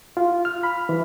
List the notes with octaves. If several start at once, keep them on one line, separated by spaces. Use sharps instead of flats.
F4
F6
B5
E3